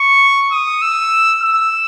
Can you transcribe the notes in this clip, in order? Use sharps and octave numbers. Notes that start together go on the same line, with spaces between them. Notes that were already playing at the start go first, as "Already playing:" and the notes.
Already playing: C#6
D#6
E6
E6